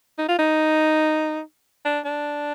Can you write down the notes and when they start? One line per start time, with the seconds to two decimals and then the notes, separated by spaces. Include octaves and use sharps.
0.19 D#4
0.28 F4
0.39 D#4
1.85 D4
2.05 D4